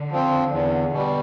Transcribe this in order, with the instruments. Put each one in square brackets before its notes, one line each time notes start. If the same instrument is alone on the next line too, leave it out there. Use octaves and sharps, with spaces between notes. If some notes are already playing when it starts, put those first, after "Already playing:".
Already playing: [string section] D3
[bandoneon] F3 C4
E2
B2 G3